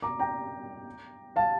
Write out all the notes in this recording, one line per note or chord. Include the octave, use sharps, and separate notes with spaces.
A#5 D6
G5 A#5
F5 A5